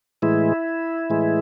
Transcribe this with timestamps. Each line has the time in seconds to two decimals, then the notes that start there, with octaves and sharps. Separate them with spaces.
0.22 A2 E3 G#3 E4
1.10 A2 E3 G#3